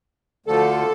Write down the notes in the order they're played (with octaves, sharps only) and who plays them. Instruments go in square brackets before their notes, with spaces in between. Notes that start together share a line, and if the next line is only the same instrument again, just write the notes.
[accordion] D2 D3 F3 A4